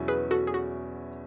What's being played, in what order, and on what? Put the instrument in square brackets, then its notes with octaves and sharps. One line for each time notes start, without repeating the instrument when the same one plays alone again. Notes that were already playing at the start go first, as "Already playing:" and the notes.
Already playing: [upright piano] E2 B2 F#3 C#4 E4
[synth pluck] G#4 B4
F#4 A4
G#4
F#4